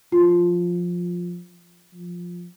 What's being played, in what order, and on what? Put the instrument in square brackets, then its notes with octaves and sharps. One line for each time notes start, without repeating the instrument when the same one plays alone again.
[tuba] F3 [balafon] F4
[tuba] F3